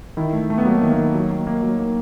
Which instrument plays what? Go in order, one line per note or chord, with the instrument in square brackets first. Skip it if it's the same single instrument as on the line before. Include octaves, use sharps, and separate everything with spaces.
[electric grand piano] D#3 E4
A3
A3
B3
F#3 A#3
D#3
A#3
D#3
F#3
A#3
A#3
F#3
A#3